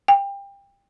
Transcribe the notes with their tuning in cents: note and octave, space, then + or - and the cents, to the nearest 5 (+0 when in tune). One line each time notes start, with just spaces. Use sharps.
G5 +25